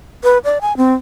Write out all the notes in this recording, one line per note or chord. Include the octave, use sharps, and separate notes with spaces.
B4
D5
G#5
C4